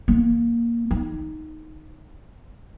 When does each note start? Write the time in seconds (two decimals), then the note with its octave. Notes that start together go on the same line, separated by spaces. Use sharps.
0.08 A#3
0.91 D#4